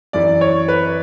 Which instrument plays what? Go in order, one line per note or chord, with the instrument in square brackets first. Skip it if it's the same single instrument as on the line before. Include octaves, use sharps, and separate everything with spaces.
[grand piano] F#2 E3 D5
C#5
B4